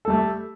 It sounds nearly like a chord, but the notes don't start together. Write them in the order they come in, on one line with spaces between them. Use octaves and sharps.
A4 G3 A3